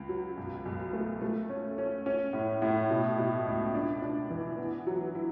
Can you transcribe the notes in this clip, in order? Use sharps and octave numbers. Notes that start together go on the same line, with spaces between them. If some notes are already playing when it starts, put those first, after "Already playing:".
Already playing: C#2
F#3
B1
B1
A3
A3
C#4
C#4
C#4
A2
A2
B2
B2
C#2
D4
D4
E3
B3
F#3
E4